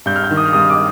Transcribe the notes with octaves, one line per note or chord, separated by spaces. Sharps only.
G2 G6
F6
G6
D#3
D#6
F6
G2 D#6
D6